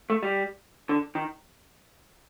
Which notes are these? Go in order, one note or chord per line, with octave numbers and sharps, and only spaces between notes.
A3
G3
D3
D#3